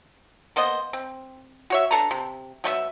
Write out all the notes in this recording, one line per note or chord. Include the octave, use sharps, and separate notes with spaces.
A#3 B3 C5 D#5
C4
F#4 C#5 E5
D4 A4 B4 A#5
C3
F#3 A3 B3 E5